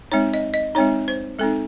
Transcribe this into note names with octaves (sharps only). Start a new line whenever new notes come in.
G#3 C4 D#4 C#5
D#5
D#5
G#3 C4 D#4 C#5
C5
G#3 C4 D#4 A4